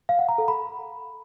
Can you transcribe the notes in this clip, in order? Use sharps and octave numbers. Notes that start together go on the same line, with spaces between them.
F5
F#5
A#5
A4
B5